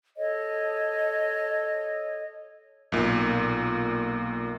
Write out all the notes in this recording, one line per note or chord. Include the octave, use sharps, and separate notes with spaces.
A4 C#5 D#5
B1 A#2